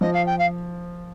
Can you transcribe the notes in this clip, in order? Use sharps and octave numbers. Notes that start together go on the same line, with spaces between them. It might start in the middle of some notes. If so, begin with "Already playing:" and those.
F3 D#5
F5
G5
F5